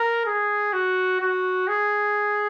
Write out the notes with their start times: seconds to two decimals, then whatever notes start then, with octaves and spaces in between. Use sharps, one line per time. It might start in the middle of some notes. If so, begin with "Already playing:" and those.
Already playing: A#4
0.26 G#4
0.73 F#4
1.21 F#4
1.68 G#4